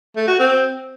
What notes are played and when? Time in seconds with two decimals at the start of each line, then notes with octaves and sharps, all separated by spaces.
0.16 A3
0.28 F#4
0.39 C4